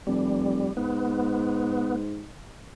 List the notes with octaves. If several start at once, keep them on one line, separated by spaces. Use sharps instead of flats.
F1 G3
G#2 B3